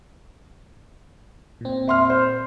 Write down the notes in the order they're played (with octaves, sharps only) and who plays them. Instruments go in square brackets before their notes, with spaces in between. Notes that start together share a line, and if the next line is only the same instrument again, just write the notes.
[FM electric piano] A#2 C4
[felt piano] E5 C6 F6
C5